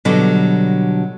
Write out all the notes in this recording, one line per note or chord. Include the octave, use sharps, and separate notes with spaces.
B2 D3 F#3 G3